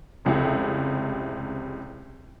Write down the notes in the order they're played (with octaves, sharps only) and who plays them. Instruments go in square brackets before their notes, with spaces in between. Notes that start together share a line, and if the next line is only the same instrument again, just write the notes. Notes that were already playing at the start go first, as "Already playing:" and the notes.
[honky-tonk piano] F1 C#2 C3 E4